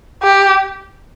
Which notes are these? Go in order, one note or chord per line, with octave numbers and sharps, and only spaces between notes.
G4